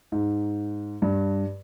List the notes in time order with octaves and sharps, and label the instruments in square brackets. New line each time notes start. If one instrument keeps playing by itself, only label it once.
[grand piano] G#2
G2